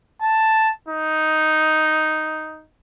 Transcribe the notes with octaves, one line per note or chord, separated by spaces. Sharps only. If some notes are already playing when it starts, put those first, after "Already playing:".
A5
D#4